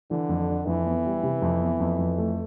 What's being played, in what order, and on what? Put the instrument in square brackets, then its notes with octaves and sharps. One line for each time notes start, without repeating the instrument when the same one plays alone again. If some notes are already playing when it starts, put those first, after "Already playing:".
[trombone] D3 [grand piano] E3
[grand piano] F2
D4
[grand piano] F2 [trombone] E3
[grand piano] B3
G3
C3
F2
B3
F2
F2
A3